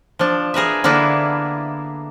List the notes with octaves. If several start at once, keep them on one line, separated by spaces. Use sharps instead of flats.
F3 D4
G#4 A#4 B4 E5
D3 A#3 B3 D4 E4